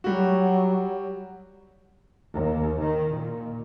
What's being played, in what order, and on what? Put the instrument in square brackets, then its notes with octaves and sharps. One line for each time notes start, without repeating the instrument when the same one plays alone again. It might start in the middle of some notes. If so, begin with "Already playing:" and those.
[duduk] F#3 [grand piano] G3 F#4
[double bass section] D#2
D#3
A#2